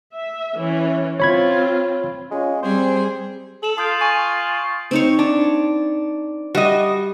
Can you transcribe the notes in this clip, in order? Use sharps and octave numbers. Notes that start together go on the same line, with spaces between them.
E5
E3 C#4
C4 F4 C#5 B5 G#6
G#3 C#4 F4
G3 C4 G#4 C5
A4 E7 F#7
F4 D#6 G6 D7
G#5 C#6
C4 D#4 C#5
D4
G3 F#4 D#5